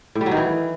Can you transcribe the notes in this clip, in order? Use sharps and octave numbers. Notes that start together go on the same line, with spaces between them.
A2
G3
F#3
D#3
E3